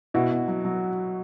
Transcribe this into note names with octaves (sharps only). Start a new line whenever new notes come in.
B2 E4 F#4
B2
F#3
F#3